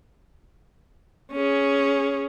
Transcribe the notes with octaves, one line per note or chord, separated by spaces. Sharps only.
C#4 G#4